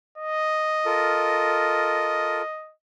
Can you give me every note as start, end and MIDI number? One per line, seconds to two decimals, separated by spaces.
0.18 2.73 75
0.86 2.42 65
0.86 2.42 69
0.86 2.42 70